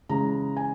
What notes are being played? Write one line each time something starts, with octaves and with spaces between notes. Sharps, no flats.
C#3 E3 G#3 A#5
G#5